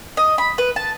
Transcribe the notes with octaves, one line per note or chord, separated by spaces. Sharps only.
D#5
B5
B4
A5